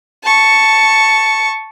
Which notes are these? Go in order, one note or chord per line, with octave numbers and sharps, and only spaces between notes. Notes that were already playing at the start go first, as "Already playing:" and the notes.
A5 C#6